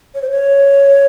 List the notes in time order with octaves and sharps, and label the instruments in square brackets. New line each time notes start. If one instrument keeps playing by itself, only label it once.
[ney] C#5
C5
C#5